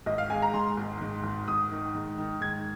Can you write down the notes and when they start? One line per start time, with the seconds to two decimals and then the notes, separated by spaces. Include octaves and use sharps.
0.06 G#1 D#5
0.18 F5
0.30 G#3 G#5
0.42 A#5
0.53 G#2 C6
0.77 G#1
1.01 G#2
1.24 G#1
1.48 G#1 D#6
1.71 D#3
1.94 G#2
2.18 D#3
2.41 G#2 G#6